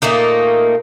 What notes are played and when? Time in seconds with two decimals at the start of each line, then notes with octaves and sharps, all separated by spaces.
0.02 A#2 A3 A#3 D#4